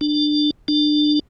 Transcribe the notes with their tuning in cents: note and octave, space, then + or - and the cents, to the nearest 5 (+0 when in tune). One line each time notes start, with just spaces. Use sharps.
D4 +20
D4 +25